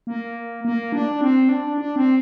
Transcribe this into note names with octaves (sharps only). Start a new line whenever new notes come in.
A#3
A#3
D4
C4
D4
D4
C4